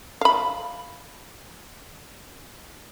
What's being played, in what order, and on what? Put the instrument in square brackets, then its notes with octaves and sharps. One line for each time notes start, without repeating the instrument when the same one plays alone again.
[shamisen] F5 B5